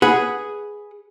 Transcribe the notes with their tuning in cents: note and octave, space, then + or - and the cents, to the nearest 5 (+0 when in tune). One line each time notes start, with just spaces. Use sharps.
G#4 +0 B4 -5 F#5 +0